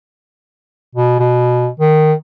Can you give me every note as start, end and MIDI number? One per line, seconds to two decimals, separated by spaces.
0.95 1.18 47
1.19 1.69 47
1.80 2.13 51